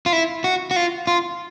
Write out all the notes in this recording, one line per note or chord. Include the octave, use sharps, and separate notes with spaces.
F4
E4
F#4
F#4
F4
F4